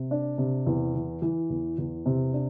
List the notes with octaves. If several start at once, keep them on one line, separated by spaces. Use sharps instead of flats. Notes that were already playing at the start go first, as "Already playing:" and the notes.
Already playing: C3
D4
C3
E2
E3
E3
E2
E2
C3
D4